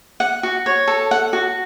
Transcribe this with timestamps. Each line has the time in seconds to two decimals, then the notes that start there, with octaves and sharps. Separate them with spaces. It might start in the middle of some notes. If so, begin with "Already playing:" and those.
0.20 F#5
0.43 F#4
0.66 C#5
0.88 A4
1.11 F#5
1.33 F#4